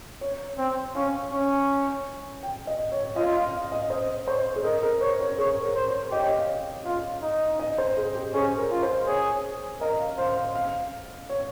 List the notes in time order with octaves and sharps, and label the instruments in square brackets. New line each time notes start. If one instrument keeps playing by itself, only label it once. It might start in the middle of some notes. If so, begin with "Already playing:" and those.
[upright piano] C#5
[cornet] C4
[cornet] C#4 [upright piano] F5
[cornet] C#4
[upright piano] G5
D#5
C#5
[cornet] F4 [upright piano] D#5
[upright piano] F5
F5
D#5
[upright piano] C5 [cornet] D#5
[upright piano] C5 [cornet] C#5
[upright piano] G#4
[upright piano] A#4 [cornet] D#5
[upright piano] A#4
[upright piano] C5 [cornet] C#5
[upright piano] C#5
[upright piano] G#4 [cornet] C#5
[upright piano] A#4
[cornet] C5
[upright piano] C#5
[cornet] G4 [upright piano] D#5
[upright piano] C#5
D#5
F5
[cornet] F4 [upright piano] F5
[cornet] D#4
[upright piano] D#5
C5
G#4
G4
[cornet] C#4 [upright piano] G#4
[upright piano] A#4
[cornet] F4
[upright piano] C5
[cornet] G#4 [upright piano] C#5
[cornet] A#4 [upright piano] D#5
[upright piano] F5
[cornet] C5 [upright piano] F5
[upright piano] F5
F5
C#5